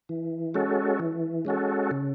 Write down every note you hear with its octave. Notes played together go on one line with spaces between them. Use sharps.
E3
G#3 C#4 F#4 A4
E3
G#3 C#4 F#4 A4
C#3